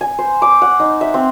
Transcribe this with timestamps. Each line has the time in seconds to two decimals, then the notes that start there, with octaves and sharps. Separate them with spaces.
0.01 G#5
0.19 C5
0.42 D6
0.62 F#5
0.80 D#4
1.01 E5
1.14 C4